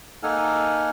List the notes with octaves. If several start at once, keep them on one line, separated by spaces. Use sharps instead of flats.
A#3 D#4 A4 F#5 G#5 F6